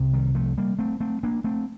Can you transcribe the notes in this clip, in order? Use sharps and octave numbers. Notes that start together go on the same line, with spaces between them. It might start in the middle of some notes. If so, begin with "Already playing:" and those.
Already playing: C2 C3
D#3 G3
F3 A3
G3 A#3
A3 C4
A3 C4
A#3 D4
A3 C4